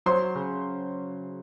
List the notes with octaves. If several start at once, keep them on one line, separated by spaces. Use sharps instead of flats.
F#3 C5 C6
C#3